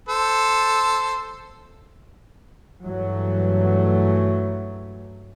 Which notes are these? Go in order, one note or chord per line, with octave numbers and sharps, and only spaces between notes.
A4 C5
G2 E3 F#3 A3